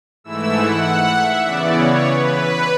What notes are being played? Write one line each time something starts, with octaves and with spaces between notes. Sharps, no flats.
G#2 E3 A3 E4 E6
F#5
E5
C#3 E3 B3 D5
C#5
B4